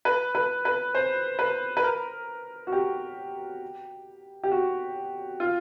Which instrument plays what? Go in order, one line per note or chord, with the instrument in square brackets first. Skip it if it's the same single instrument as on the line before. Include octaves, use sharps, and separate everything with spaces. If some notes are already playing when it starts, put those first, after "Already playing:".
[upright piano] B4
B4
B4
C5
B4
B4
A#4
F#4
G4
G4
F#4
F4